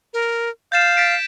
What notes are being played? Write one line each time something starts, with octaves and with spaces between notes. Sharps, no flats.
A#4
F5 G6 A6 E7
A6 B6 D7